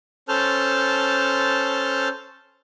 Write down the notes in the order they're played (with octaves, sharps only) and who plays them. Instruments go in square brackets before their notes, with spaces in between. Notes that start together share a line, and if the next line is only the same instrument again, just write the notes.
[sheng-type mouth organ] C#4 A4 C5 A5 F6 G6